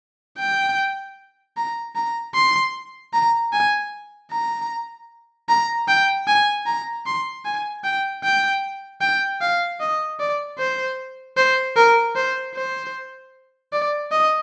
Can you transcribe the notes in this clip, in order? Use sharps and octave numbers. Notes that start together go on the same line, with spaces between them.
G5
A#5
A#5
C6
A#5
G#5
A#5
A#5
G5
G#5
A#5
C6
G#5
G5
G5
G5
F5
D#5
D5
C5
C5
A#4
C5
C5
D5
D#5